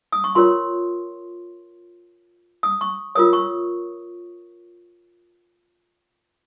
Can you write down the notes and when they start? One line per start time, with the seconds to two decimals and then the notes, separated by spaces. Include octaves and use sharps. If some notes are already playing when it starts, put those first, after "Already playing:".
0.12 D#6
0.24 C#6
0.35 F4 A#4 C#5 C6
2.63 D#6
2.81 C#6
3.15 F4 A#4 C#5 D#6
3.33 C#6